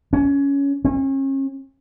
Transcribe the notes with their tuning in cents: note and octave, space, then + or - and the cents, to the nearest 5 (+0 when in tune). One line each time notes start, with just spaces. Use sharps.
C#4 +15
C#4 -35